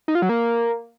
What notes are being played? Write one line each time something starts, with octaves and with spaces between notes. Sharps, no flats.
D#4
F4
F#3
A#3